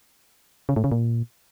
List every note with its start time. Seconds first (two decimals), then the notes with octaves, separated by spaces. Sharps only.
0.69 C#3
0.76 A2
0.84 C#3
0.92 A#2